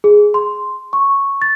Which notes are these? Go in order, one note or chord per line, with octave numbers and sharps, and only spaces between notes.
G#4
C6
C#6
A6